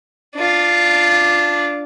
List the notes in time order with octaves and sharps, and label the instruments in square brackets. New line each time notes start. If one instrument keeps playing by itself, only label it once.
[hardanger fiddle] D4 F4